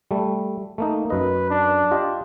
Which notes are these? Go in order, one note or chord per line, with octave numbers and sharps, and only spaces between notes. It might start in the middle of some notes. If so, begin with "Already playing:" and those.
G3 A3
A3 A#3 D#4
F#2 B4 D#5
D4
F4 G4 D#5